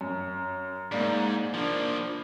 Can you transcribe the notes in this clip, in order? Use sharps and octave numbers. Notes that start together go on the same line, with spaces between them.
F#2
G#2 A#3 D5
F3 A#3 D4